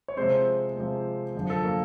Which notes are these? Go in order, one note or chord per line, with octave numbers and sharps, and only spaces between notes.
C#5
C3 F3 G#3 C4 C5
C3 F3 G#3
F#2 D3 F3
A4
A#3 A#4